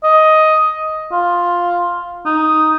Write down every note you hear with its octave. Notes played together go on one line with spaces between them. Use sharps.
D#5
F4
D#4